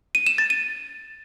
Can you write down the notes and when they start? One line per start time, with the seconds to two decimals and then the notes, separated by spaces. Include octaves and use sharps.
0.15 D#7
0.27 E7
0.38 A6
0.50 D#7